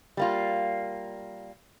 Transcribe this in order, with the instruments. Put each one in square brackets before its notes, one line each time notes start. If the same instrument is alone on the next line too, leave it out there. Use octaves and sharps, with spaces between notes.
[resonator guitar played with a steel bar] G3 A#3 F4